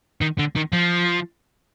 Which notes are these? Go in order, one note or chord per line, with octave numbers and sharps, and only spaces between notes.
D#3
D3
D#3
F3